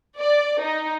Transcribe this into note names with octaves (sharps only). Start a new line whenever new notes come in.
D5
D#4